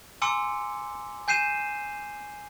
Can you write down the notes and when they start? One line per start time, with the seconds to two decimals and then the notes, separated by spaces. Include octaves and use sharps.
0.22 G#5 A#5 C6 D6 E6 C#7
1.28 G#5 G6 C7 D#7 E7